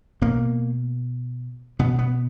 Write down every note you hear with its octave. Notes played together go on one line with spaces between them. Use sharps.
B2 A#3
B2 B3
B3